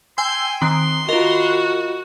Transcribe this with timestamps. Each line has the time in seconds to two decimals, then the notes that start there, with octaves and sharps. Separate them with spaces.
0.18 G5 G#5 C6 E6
0.62 D#3 C4 C6 F#6
1.09 F4 F#4 A#4 D#5